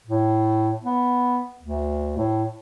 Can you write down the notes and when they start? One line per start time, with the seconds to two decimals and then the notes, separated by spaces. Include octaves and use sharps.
0.07 A2
0.83 B3
1.62 D2
2.17 A2